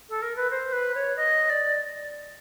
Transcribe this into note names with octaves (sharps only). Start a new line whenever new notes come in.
A4
A#4
B4
C5
B4
C#5
D#5
D5